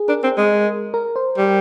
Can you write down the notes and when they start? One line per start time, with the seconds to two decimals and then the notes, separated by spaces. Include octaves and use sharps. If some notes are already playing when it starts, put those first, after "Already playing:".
Already playing: G#4
0.08 D4 A#4
0.23 C4
0.37 G#3
0.94 A#4
1.16 C5
1.37 G3